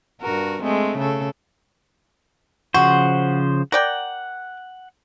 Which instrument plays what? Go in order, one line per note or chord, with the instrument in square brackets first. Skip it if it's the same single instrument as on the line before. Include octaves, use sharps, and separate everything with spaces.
[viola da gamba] G2 F#4 A#4
G#3 A3 C4
C#3 A4
[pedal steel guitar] C#3 F3 C5 [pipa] F#4
[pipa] A#4 D5 G5 [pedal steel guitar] F#5